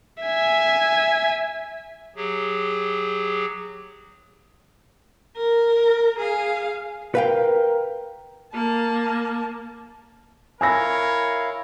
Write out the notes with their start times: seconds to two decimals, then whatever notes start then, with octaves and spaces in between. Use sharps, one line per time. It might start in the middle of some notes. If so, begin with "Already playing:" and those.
0.23 E5 G#5
2.16 F#3 G4 G#4
5.37 A#4
6.19 G#4 F5
7.15 A#4 B4 F5 G5
8.54 A#3 A5
10.61 E4 A#4 C#5 F5 G#5 E6 A#6